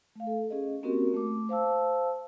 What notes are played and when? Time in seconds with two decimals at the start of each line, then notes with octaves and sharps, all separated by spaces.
0.16 A3 F5
0.27 A4
0.50 C#4 G#4 D#5
0.83 A#3 C4 C#4 F#4 G4 A#4
1.14 A3 D6
1.49 C5 F5 A5 E6